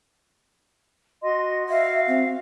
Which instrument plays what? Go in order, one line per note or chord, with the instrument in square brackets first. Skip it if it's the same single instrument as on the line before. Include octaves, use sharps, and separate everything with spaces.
[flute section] F#4 D#5 C6
[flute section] F#4 F5 [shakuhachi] E5
[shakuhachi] C4